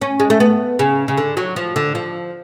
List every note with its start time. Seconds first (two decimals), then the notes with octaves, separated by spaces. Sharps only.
0.02 C#4
0.20 G#3
0.30 A3
0.40 B3
0.79 C#3
1.08 C#3
1.17 D3
1.37 F#3
1.56 F3
1.76 D3
1.95 F3